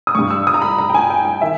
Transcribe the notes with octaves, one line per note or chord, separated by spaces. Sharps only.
D#6
G2 G3 C#6
E6
D#6
A#5
B5
A#5
G5
G#5
G5
G5
D#3 E5